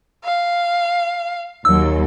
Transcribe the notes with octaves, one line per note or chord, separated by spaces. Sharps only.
F5
D#2 F#3 E6